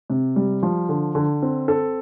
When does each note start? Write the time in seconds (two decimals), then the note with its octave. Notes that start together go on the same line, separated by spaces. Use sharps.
0.10 C3
0.36 G3
0.63 F3
0.89 D3
1.15 D3
1.42 C4
1.68 A4